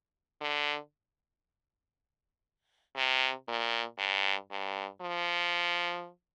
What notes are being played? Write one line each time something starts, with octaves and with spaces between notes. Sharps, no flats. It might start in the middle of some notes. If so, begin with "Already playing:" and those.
D3
C3
A#2
G2
G2
F3